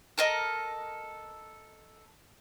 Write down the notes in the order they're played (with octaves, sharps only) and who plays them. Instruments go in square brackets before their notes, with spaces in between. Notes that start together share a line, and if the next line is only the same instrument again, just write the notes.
[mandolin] A4 A#4 D#5